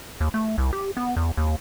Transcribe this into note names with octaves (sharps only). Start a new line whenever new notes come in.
D#2
A3
C2
G4
B3
E2
D#2